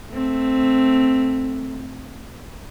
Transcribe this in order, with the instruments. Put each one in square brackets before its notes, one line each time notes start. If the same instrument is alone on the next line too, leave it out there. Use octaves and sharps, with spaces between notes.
[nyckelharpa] A3 C4